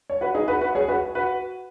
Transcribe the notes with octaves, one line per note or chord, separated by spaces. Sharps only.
C#5
F#4 B4
D#4 G#4
F#4 B4
F#4 B4
G#4 C#5
F#4 B4
F#4 B4